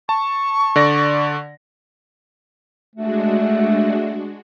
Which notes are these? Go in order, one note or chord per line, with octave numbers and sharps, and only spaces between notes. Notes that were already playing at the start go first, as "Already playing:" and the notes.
A5 C#6
D3 D5 A#6
G#3 A3 D4 F#4